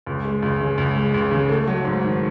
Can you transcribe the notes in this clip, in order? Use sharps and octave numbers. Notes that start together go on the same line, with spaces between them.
C#2
G#3
C#2
C#3
C#2
G#3
C#2
C#3
A3
F#3
G#2
D#3